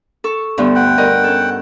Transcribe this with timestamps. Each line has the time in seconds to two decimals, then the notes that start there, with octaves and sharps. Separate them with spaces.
0.24 A4 C#6
0.58 D2 G2 B3
0.75 F#5 G5
0.98 G2 A#4 D#5
1.24 C#4 A4